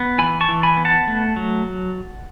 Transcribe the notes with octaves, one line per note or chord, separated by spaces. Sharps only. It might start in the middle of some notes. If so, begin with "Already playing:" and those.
Already playing: B3
E3 G#5 B5
A5 C#6
E3
G#5 B5
B3
F#5 A5
A3
F#3